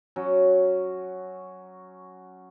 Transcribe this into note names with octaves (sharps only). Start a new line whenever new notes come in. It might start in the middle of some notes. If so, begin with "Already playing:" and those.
F#3 C#4